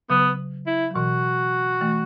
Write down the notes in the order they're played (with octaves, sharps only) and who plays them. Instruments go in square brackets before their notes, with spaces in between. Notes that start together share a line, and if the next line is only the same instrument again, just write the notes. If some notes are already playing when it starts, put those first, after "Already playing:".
[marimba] C#3 F#3 [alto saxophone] B3
[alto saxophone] E4
[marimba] F#3
[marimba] B2 E3 [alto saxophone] F#4
[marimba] E3 A3